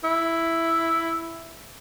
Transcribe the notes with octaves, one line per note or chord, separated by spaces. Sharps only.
E4